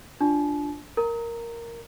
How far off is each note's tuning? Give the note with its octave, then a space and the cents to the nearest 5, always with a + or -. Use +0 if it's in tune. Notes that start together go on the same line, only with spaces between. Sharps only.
D4 +0 F4 +0 A5 -40
A#4 +0 A#5 -15